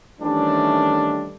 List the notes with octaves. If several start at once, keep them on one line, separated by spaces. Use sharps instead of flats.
D#3 E3 G3 A3 C#4 D4